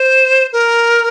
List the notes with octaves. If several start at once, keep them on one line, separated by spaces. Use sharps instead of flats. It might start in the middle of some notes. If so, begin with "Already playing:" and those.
Already playing: C5
A#4